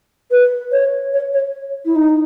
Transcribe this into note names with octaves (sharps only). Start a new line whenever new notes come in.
B4
C#5
C#5
C#5
E4
D#4